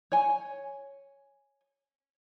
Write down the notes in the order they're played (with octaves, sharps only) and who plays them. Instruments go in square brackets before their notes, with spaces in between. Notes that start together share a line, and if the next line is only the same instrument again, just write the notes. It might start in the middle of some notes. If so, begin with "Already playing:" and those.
[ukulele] C#5 G#5